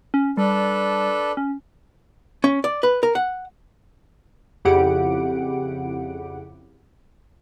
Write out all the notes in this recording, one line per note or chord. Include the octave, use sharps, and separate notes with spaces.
C#4
G3 D4 A4 B4
C#4
C#4
D5
B4
A#4
F#5
F2 C#3 E4 G4 F#5 D7